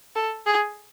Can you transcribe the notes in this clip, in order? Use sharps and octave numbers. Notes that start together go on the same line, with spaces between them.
A4
G#4